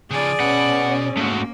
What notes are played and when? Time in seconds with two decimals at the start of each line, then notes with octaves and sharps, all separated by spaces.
0.11 C#3 F3 G#4 D5
0.40 B2 C#4 B4 F#5
1.17 G#2 A3 A#3 F#4